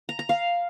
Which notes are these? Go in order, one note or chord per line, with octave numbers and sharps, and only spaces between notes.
A#5
A#5
F5